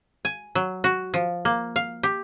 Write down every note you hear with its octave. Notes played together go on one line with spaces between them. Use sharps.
G#5
F#3
F#4
F3
A#3
F5
G4